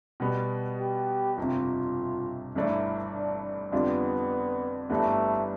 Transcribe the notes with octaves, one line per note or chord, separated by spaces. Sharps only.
B2 G3 B3
G4
G1 F2 C3 F4
G1 G2 E3 A3 D4 E4
D4
F2 D3 G3 B3 D4 F4
G1 G2 E3 G3 A3 B3